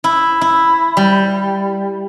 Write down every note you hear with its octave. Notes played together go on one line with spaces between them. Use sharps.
E4
E4
G3